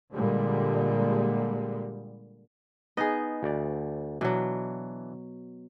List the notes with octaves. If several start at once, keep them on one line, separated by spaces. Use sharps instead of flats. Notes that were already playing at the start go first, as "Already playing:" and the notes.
A#2 D3 G3 G#3
B3 D#4 G#4 D#5
D2 D5
B2 E3 F#3 D4